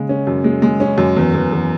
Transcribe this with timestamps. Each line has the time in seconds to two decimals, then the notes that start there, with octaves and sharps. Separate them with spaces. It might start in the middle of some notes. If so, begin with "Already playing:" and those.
Already playing: C#3 G#3
0.09 C#4
0.27 F#2
0.44 G#3
0.62 G#3
0.80 C#4
0.98 F#2
1.17 E2
1.34 E2
1.52 E2